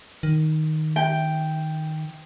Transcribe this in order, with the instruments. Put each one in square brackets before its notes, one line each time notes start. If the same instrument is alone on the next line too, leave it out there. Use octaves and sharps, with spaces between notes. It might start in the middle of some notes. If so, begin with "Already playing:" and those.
[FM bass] D#3
[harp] G5